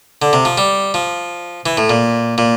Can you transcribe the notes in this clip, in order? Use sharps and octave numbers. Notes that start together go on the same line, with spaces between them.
D3
C3
F3
G3
F3
E3
A2
A#2
A#2